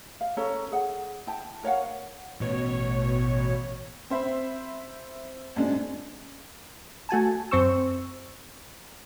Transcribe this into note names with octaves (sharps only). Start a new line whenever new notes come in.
F5
C#4 A4 C#5 A#5
G#4 F#5
E4 G5 A5
A#4 C#5 F5 F#5
A1 B2 C#5
C4 C5 E5 B5
A1 F#2 A#2 G#3 C4 D4
A3 F#4 G#5 A5
F#2 C4 C5 C#6 E6